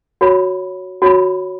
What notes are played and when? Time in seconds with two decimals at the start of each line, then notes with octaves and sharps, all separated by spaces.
0.21 F#4 C#5 B5
1.02 F#4 C#5 B5